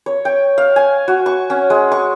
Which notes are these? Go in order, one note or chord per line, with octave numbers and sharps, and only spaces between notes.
C#5
G5
F5
G#5
F#4
C#6
C#4
G#3
C#6